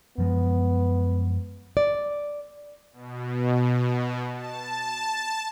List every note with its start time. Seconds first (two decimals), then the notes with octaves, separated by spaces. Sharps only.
0.18 F#2 F3 G#3 B3
1.77 D5
2.93 B2
4.34 A5